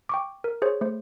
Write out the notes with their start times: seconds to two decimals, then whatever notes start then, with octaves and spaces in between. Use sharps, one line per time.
0.09 G5 C#6 D6
0.44 A#4
0.62 G#4 C5 C#5
0.81 A3 C5